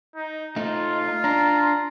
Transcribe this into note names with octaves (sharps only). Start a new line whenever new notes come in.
D#4
A3 D#4 F4
D4 A#5